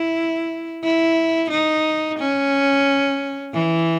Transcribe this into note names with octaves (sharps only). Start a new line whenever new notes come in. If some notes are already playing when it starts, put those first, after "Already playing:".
Already playing: E4
E4
D#4
C#4
E3